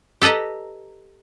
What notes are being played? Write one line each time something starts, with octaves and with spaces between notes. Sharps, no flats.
G4 A4 B4 D#5 A#5